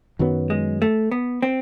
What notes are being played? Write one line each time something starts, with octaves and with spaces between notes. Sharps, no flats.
F#2 D#3 F#3 B3
G#3
A3
B3
C4